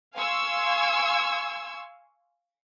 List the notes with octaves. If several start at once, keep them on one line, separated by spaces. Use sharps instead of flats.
F5 G#5 C6 C#6 E6 G#6